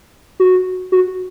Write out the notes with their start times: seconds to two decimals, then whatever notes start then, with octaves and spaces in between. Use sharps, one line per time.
0.40 F#4
0.92 F#4